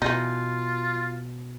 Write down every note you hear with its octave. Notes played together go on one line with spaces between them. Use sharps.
B2 E3 D#4 F4